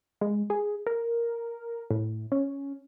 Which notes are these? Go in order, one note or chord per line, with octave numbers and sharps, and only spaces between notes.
G#3
G#4
A#4
A2
C#4